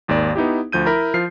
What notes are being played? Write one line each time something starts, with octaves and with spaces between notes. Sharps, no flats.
G#1 D#2 A#3 D5
B3 D#4 E4 G4
D2 F3 G6 D#7
E4 A#4 A#5 B5
F3 F4 F6 C7